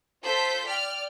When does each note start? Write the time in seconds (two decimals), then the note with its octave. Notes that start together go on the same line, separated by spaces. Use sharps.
0.25 F4 A4 C5 G6 B6
0.67 D5 G5 F6